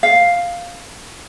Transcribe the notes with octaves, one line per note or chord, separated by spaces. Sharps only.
F5